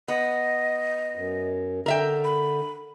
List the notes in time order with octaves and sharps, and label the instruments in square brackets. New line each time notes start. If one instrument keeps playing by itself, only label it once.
[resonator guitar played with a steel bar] B3 [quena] D#5
[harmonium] F#2
[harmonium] D3 [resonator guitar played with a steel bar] A#4 E5 G5
[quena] B5